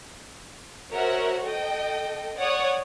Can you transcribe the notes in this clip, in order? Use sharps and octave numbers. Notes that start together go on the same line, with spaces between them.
F#4 A#4 C5 C#5 E5 F#5
A4 D#5 G5
C#5 D5 F#5 D#6